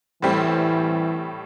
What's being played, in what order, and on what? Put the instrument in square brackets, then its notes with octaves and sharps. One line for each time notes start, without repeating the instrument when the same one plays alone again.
[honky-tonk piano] A2 G3 C4 [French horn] E3